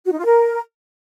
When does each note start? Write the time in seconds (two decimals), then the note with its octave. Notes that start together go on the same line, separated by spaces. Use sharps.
0.06 F#4
0.12 D#4
0.19 F4
0.25 A#4